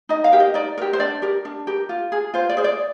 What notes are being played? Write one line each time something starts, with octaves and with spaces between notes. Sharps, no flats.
D#4 D#5
F5
G4 A#4
D#5
D#4 D5
G4 A#4
C5
D4 D5
G4 A#4
D4
G4 A#4
F4
G#4
F4 C5
D5
G#4 C5
D5